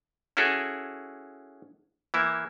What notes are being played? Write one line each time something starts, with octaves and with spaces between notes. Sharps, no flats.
C#4 E4 F#4 G#4 A4
E3 A#3 E4